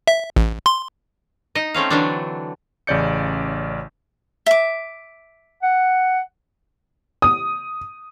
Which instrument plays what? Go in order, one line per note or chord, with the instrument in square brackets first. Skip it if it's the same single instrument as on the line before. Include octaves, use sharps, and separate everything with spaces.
[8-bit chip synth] E5
A1
C6
[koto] D#4 D#5
A3 C4 C#4 F5
D3 E3 F#3 A3 D4
[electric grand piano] A1 C#3 C#5 D5 G6 C#7
[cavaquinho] E5 D6
[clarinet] F#5
[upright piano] D#6